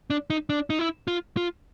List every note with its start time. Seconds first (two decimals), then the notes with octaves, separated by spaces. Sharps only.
0.10 D4
0.30 D#4
0.50 D4
0.70 D#4
0.79 E4
1.08 F4
1.37 F4